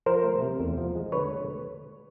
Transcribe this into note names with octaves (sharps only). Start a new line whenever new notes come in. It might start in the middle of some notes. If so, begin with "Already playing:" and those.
F3 A#4 C5
A3
C3
E2
F3
G#3
D3 B4 C#5